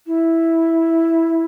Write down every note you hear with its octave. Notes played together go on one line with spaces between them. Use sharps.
E4